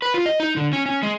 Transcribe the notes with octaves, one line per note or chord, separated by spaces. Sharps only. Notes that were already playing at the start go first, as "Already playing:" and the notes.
B4
F4
D#5
D#4
D3
C#4
C#4
G#3